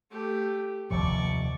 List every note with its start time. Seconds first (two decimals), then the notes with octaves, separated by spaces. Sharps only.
0.11 A3 G4
0.91 F1 D#2 F3 D5 C#6